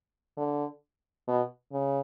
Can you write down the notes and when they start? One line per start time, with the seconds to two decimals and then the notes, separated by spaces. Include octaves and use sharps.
0.37 D3
1.28 B2
1.73 C#3